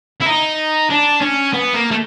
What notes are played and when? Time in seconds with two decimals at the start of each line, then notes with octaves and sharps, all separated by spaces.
0.21 E4
0.27 D#4
0.90 D4
1.21 C#4
1.53 B3
1.74 A#3
1.91 A3